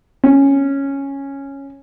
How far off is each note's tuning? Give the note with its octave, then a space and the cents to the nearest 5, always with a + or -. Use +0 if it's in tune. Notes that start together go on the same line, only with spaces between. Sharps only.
C#4 -5